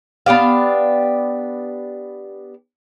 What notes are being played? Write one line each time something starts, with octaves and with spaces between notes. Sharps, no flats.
B3 D4 G4 F5